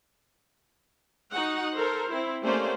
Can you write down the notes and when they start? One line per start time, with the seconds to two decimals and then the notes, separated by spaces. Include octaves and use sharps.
1.31 D#4 F#4 F#5
1.75 A4 A#4 C5
2.10 C4 E4
2.42 A3 A#3 C#4 G4 C5 D5